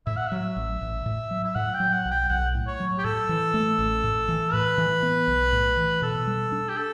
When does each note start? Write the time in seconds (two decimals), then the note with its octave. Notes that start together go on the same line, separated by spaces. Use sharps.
0.07 A2 E5
0.17 F#5
0.28 F#3 E5
0.56 A1
0.81 A1
1.06 A2
1.31 F#3
1.44 E5
1.55 A2 F#5
1.74 G5
1.80 F#3
1.93 F#5
2.05 B1
2.11 G5
2.30 B1 F#5
2.55 A2
2.67 C#5
2.80 F#3
2.98 G4
3.04 A2 A4
3.29 E3
3.54 A3
3.79 A1
4.04 A2
4.28 E3
4.53 A2 B4
4.78 E3
5.03 B3
5.28 B1
5.52 A2
5.77 E3
6.02 B2 A4
6.27 G3
6.52 D4
6.69 G4
6.77 A4